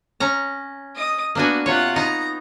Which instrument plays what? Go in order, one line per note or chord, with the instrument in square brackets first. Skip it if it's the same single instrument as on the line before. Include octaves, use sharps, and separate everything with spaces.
[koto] C#4 A#5
[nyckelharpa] D#5 D#6
[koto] A#3 D4 G#5 [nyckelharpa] B3 F#4
[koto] C3 C#5 [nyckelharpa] F4 F#5
[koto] B3 D#4 [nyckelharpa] A#5